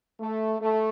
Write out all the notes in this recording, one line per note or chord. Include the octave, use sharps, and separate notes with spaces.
A3
A3